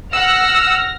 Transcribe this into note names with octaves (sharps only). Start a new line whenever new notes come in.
F#5 E6 F6 A#6